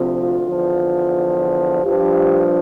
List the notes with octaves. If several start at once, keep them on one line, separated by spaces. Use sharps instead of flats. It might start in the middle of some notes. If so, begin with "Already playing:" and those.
Already playing: D2 C3 F3
F4
E2 D3 F3
G2 F3 G4